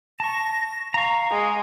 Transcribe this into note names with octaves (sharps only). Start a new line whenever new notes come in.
A5 C#6 A#6
F5 A#5 C#6
G#3